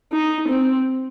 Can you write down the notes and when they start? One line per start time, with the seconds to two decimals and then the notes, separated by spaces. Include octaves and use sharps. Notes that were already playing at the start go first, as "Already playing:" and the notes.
0.13 D#4
0.49 C4